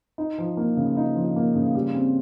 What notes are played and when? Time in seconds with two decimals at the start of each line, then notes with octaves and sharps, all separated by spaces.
0.18 D#4
0.38 F3
0.57 A#3
0.77 C#3
0.97 D#4
1.16 F3
1.36 A#3
1.56 C#3
1.75 G3
1.94 C4